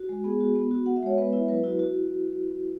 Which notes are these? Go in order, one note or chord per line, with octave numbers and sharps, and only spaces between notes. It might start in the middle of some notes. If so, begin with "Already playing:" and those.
Already playing: F#4
G#3
B3 G#4
F#4
B3
F#4
F#4 F#5
E5
G#3 C#5
B3 B4
E4 E5
F#3 B4
E4 F#4
F#4